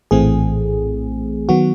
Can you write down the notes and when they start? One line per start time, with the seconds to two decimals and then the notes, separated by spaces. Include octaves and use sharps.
0.11 A#1 A2 E3 A3 C4 G#4
1.49 D#3 F#3 B3 F#4